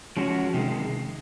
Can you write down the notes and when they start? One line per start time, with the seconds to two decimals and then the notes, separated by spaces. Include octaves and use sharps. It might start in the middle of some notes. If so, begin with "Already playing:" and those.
0.17 F3 G#3 C#4 F#4
0.54 C3 D#3 G#3